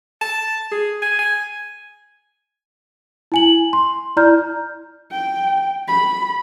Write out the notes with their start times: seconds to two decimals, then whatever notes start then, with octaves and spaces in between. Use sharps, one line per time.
0.21 A5
0.71 G#4
1.02 G#5
1.19 G#5
3.32 E4 G#5 F#7
3.73 C6
4.17 E4 D5 A#5 F6 G6
5.11 G5
5.88 B5